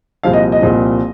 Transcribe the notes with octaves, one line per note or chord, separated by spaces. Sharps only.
C2 A#2 F3 F5
D#5
D#5
C2 A#2 F3